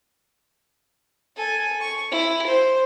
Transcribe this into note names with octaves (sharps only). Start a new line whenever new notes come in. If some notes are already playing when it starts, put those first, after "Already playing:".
A4 G#5
C#6
E4
C5